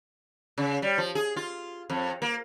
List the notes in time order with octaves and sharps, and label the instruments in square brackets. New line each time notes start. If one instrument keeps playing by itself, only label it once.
[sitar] C#3
G3
F3
G#4
F4
F2
A#3